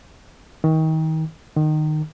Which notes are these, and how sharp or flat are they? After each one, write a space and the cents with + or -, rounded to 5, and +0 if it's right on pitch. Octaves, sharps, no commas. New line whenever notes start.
D#3 +30
D#3 -20